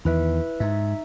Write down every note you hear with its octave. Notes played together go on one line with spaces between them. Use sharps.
E2 D#3 E4 B4 E5
G#2 D#4 E5